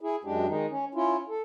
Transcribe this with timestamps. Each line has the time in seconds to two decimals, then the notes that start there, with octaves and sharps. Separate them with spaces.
0.01 E4 G#4
0.24 F#2 G#3 D4 G4
0.47 D#3 G#3 D#4
0.70 C#4
0.95 C#4 E4 F4
1.29 A4